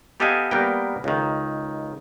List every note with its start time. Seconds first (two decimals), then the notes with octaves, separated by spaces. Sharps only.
0.20 B3 G4 A4 D#5 F5 G#5
0.51 G3 A#3 B3 A#4 G5
1.04 C#2 D#3